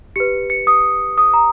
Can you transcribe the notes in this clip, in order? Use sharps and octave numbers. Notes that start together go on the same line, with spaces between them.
G4 B4 C#7
C#7
D#6
D#6
A#5